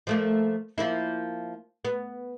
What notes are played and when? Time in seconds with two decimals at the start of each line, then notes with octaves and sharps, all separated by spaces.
0.07 F3 A3 A#3
0.78 F3 A#3 E4
1.85 B3